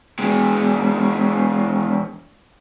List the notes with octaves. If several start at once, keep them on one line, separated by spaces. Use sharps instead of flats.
E2 G#3